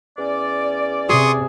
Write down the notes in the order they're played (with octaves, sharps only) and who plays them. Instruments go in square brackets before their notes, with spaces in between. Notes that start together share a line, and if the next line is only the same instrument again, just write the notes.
[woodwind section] E2 C#4 D5
[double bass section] C3 [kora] G#4 [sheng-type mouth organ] C6 C#6 D#6